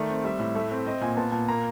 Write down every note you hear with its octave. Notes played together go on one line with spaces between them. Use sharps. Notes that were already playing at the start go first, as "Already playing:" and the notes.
Already playing: D#3 A3 D5
C4
G3 E5
A2
A3 E5
C4
C4 D#5
A#2 G#5
B3 A5
A#2 A5
A#3 A#5